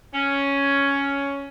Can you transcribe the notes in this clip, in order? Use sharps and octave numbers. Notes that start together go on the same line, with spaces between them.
C#4